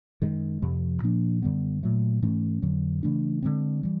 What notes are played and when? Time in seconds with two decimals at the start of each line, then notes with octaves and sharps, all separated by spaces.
0.22 F#2 D#3 G#3
0.62 F2 C3 F3
1.02 A#2 F3 A#3 D4
1.42 F#2 D3 G3 B3
1.83 A#2 F#3 A3
2.22 G#2 E3 A3 C#4
2.62 F2 D3 F#3
3.03 C#3 E3 A3 D4
3.42 D3 F3 G#3 C4
3.83 E3 G3